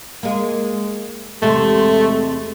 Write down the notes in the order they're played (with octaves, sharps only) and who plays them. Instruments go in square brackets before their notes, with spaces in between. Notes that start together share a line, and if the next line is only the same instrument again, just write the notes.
[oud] G#3 A#3
[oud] E2 C3 G#3 [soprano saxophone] A3